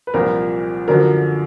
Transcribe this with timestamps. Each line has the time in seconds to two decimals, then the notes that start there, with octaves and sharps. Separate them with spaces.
0.07 B4
0.14 C2 A#2 F3 A#3 A#4
0.87 F#2 D3 F3 A#4